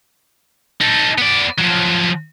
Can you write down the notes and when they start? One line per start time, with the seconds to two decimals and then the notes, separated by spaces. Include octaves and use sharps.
0.81 D#4 A4
1.18 B3 D5
1.59 F3 F#3